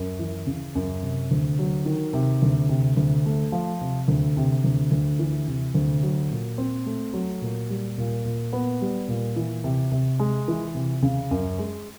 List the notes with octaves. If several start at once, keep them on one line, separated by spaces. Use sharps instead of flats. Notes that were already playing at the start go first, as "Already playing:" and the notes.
Already playing: F#2
E3
C#3
F#2
C3
D2
F#3
D#3
C3
D2
C3
D2
A3
F3
C3
D2
C3
D2
D2
E3
C3
D2
F#3
A#2
C4
A3
F#3
A#2
G3
A#2
A#2
B3
G3
A#2
E3
C3
C3
G#3
E3
C3
C#3
F#2
G#3